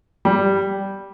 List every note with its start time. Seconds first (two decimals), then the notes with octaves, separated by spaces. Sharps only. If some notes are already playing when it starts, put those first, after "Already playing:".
0.25 G3